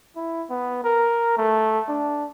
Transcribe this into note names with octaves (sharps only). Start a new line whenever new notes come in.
E4
B3
A#4
A3
D4